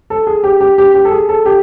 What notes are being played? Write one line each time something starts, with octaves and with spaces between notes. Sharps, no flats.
A4
G#4
G4
G4
G4
G4
A4
G#4
A4
G4